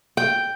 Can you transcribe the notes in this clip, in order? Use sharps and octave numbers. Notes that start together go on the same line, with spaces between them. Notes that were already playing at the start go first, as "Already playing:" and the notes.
G5